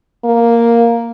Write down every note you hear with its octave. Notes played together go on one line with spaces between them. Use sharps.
A#3